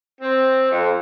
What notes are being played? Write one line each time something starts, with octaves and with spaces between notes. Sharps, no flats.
C4
F2